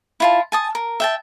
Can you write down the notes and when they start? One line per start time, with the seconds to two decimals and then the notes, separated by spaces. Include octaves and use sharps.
0.20 E4 F4 A5
0.52 G#5 A5 D#6
0.75 A#4
1.00 E5 G5 A5